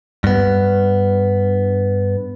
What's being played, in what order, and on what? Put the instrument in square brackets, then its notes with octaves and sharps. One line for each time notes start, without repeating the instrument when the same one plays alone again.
[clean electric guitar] G2 B3